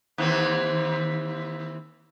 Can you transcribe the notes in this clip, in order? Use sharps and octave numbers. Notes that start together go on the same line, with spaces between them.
D#2 E3 C4